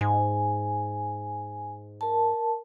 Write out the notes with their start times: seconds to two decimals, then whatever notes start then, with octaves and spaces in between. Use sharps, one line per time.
0.01 G#2 G#5
2.01 A#4 A5